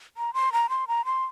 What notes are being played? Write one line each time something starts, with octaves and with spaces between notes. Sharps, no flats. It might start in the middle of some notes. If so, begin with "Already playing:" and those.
A#5
C6
A#5
C6
A#5
C6